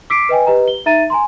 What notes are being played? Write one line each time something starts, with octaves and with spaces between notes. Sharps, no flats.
D6 E6 B6 C7 D7
B4 D#5 G5 G#5
G4 B4 D#5 A#5
G7
D#4 E5 A#5 A6 D#7
G#5 A#5 C6